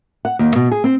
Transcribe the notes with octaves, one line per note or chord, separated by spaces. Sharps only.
F#5
D#2
B2
G#4
C4